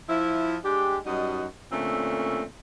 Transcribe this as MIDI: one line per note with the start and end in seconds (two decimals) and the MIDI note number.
0.09 0.56 53
0.09 0.56 64
0.65 0.98 56
0.65 0.98 62
0.65 0.98 67
1.06 1.46 42
1.06 1.46 55
1.06 1.46 63
1.06 1.46 66
1.06 1.46 75
1.72 2.44 46
1.72 2.44 50
1.72 2.44 57
1.72 2.44 60
1.72 2.44 61